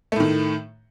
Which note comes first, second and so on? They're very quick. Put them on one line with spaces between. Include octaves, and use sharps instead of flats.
A3 A2 D#3